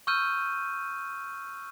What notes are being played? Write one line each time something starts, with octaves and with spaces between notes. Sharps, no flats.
C#6 E6 F6 G6 D#7